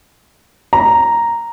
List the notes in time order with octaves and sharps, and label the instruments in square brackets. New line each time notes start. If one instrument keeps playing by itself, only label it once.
[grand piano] A#5